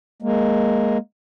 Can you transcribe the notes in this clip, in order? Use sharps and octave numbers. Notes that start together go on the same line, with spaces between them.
G#3 A#3